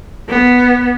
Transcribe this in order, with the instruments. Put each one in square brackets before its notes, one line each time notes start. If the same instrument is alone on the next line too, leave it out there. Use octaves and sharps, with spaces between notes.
[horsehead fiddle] B3